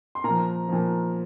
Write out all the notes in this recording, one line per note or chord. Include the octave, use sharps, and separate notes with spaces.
C6
A#2 F3 A#4 A#5
A#2 F3